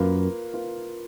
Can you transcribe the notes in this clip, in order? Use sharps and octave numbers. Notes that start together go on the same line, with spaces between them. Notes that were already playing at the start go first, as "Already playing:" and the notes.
Already playing: F#2 A#3 F4 B4 F5
A#3 F4 B4 F5